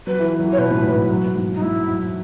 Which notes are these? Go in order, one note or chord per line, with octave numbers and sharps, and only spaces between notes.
F#3 B4
E3
E3
F#3
E3
C#5
B2 B4
A2
G#2
E3
F#3
G#2
D#4
G#2 E4
F#2